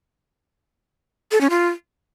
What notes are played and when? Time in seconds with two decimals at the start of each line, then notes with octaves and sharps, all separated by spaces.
1.32 A4
1.41 C#4
1.50 F4